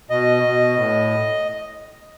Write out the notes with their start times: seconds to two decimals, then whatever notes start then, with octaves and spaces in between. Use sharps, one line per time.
0.10 B2 D#5
0.43 B2
0.76 A2